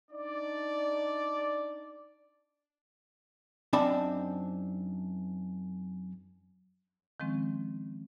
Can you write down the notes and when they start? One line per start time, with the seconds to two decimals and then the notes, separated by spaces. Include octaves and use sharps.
0.11 D4 D#4 D5
3.73 F#2 C4 D4 D#4 A5 B5
7.20 D#3 F3 G#3 C4 C#4